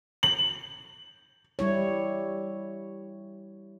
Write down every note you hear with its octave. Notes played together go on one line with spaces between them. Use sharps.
F#7
G3 E4 C#5